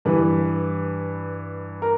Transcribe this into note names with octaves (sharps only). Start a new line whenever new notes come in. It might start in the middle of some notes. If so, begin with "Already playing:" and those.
G2 E3 B4
A#4